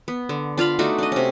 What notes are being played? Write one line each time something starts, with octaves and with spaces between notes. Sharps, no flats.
B3
D3
D4 F4 F5 B5
A3 D4 D#4 F#4
D4 D#5
C3 C#4